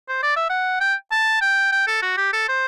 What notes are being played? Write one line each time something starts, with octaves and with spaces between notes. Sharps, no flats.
C5
D5
E5
F#5
G5
A5
G5
G5
A4
F#4
G4
A4
C5